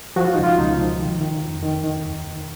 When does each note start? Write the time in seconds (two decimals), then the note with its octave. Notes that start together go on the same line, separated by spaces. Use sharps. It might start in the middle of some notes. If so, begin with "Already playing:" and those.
0.16 F3 F#4
0.25 F4
0.34 C#2 D#4
0.44 F4
0.58 C#2 D#4
0.79 F3
1.00 D#3
1.21 D#3
1.42 F2
1.63 D#3
1.84 D#3
2.05 D#2
2.26 D#3